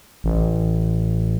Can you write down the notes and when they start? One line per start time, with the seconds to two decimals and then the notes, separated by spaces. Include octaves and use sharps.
0.24 A1